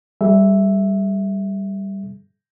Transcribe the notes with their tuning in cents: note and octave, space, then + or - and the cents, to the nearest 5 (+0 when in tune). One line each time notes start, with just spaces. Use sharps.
G3 +0 A4 -45 E5 +0